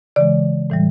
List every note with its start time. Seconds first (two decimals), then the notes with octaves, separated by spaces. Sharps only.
0.16 C#3 E3 G#3 D5
0.70 A2 E3 G3